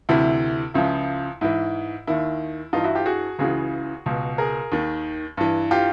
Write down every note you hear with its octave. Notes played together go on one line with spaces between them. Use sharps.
D2 C3 E3 E4
C#2 C#3 F3 E4
G#2 E3 E4
D#2 D#3 E4
G2 E3 D#4 F4
E4 F#4
F4 G4
F#4 G#4
C#2 C#3 E3 F#4 G#4
C#2 B2
G#4 A#4
D#2 D#3
G2 E3
F4 G4